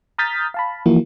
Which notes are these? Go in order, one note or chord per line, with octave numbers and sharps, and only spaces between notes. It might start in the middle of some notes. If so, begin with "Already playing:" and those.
A#5 D#6 F6 G6 A6 B6
F5 A5 B5
E3 F3 A#3 E4 F#4